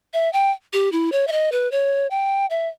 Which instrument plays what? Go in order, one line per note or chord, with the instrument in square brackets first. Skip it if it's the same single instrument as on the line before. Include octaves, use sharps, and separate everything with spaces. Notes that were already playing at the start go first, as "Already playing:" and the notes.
[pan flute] E5
G5
G4
E4
C#5
E5
D#5
B4
C#5
G5
E5